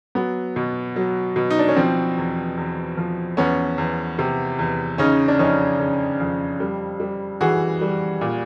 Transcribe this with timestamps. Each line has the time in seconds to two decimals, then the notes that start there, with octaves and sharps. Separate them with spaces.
0.15 F#3 B3
0.56 B2
0.96 F#3
1.36 B2
1.50 D#4
1.59 D4
1.68 C#4
1.76 F3 C4
2.17 E2
2.57 E2
2.97 F3
3.37 E2 B3 C#4
3.78 E2
4.19 C3
4.59 E2
4.98 C#3 C#4 D#4
5.28 D4
5.39 F2 C#4 D#4
5.79 C#3
6.20 F2
6.60 G3
7.00 G3
7.41 E3 F#4 G#4
7.81 G3
8.21 A#2